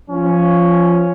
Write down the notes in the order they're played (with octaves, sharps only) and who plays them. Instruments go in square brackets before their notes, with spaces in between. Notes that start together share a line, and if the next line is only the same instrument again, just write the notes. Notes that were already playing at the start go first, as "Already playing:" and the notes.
[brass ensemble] F3 C#4